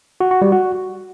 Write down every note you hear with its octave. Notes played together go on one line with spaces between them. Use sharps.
F#4
F#4
G3
F#4